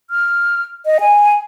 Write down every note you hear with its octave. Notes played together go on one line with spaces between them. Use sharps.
F6
D#5
G#5